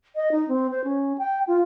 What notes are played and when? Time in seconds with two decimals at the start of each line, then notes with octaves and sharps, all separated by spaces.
0.16 D#5
0.31 D#4
0.48 C4
0.71 C5
0.84 C#4
1.18 G5
1.47 F4